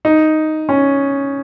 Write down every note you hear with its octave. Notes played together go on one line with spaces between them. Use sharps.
D#4
C#4